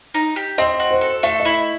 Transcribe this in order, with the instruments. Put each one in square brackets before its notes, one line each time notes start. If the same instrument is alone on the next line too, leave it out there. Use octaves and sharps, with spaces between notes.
[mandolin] D#4
G4
[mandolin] C4 [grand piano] D#5
[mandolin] F#4
[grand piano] C5
[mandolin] A4
[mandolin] A3 [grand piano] E5
[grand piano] D#5
[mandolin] E4